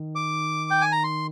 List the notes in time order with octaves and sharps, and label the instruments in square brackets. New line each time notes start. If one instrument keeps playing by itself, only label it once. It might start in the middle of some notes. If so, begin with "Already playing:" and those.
Already playing: [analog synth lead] D#3
[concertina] D6
G5
G#5
A#5
C6